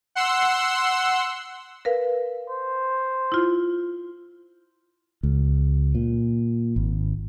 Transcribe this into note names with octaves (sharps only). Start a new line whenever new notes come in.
F#5 C6 E6
A#4 B4 F5
C5
E4 F4
C#2
A#2
G#1